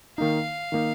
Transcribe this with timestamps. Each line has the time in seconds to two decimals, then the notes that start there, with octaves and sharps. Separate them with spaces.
0.18 D#3 A#3 D#4 F5
0.72 D#3 A#3 D#4